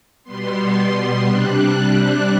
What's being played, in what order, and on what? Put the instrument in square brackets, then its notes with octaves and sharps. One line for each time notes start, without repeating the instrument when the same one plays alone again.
[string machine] B2 G3 B3 C6
C3 G3 D4 F#6